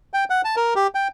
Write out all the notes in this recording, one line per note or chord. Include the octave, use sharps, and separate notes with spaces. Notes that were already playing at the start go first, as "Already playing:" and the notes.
G5
F#5
A5
A#4
G4
G5